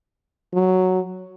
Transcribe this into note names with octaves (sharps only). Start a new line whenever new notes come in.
F#3